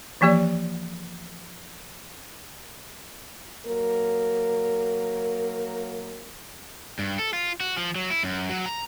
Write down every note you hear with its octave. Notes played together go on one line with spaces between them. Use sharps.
E3 F3 A#3 G4 D5
F#3 A#3 A#4
G2
A4
F4
F#4
F3
F#3
E4
F#2
F#3
A#5